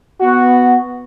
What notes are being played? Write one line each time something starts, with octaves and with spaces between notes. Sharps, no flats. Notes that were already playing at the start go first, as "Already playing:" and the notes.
B3 F#4